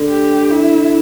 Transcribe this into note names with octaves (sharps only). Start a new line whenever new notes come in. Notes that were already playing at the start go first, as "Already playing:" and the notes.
Already playing: D2 D3
G4
E4